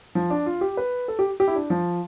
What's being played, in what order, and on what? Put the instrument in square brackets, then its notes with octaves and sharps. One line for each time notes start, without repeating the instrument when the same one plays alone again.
[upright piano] F3
D4
F4
G4
B4
A4
G4
G4
E4
D4
F3